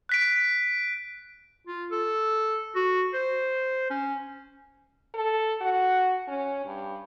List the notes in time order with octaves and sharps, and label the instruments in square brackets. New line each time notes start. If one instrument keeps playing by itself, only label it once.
[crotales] F#6 B6 D7
[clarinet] F4
A4
F#4
C5
C#4
[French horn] A4
F#4
C#4
G2